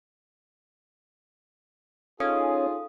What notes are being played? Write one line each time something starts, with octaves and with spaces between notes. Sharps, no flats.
C#4 D#4 F4 G#4 A4 F5 D#6